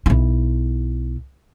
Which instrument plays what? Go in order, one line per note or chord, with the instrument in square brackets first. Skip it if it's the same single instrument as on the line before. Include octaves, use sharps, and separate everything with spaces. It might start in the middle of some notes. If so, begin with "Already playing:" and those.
[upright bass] B1 E4